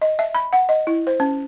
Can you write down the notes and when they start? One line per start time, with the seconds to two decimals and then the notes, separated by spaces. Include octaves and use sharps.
0.02 D#5
0.19 E5
0.35 B5
0.53 F#5
0.69 D#5
0.87 E4
1.07 C5
1.20 C#4